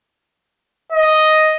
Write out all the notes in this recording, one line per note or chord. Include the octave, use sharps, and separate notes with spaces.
D#5